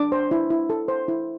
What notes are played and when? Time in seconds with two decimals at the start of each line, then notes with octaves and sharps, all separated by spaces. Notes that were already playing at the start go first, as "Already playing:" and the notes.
Already playing: D4 D6
0.12 C5
0.31 E4
0.50 E4
0.70 A4
0.88 C5
1.08 E4